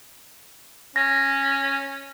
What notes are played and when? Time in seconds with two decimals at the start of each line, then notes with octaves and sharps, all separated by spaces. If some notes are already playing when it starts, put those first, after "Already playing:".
0.96 C#4 A#6